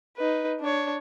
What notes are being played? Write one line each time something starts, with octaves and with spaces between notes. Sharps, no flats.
D#4 B4
D4 C#5